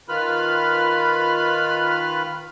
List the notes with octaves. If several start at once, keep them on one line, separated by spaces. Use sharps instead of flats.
D#3 F4 B4 B5 F6